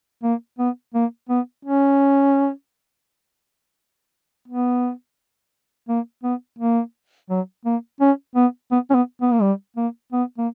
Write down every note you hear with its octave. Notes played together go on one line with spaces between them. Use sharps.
A#3
B3
A#3
B3
C#4
B3
A#3
B3
A#3
F#3
A#3
C#4
B3
B3
C#4
B3
B3
A#3
G3
A#3
B3
A#3